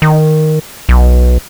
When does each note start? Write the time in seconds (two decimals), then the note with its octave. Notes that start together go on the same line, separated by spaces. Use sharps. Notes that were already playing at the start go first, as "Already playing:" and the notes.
0.02 D#3
0.89 B1